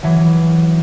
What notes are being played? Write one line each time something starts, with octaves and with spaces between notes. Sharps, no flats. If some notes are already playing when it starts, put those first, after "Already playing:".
E3 F#3